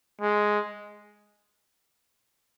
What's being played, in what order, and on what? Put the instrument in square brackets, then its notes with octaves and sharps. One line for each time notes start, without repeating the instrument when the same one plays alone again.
[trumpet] G#3